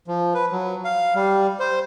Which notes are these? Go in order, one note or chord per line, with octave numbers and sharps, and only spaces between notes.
F3
B4
F#3
F5
G3
C5